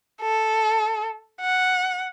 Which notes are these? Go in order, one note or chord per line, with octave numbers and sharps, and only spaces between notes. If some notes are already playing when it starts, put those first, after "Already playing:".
A4
F#5